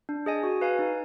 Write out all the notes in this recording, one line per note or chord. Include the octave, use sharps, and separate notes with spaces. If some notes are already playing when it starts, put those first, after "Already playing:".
D4
G#4 D#5 G#5
F#4
B4 F5 G#5
D#4